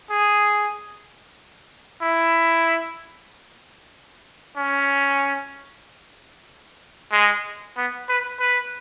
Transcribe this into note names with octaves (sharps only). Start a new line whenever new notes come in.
G#4
E4
C#4
G#3
B3
B4
B4